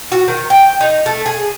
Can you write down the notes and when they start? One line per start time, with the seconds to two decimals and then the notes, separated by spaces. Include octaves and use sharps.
0.12 F#4
0.28 D#3
0.50 G5
0.81 D#4
1.06 A3
1.26 G#4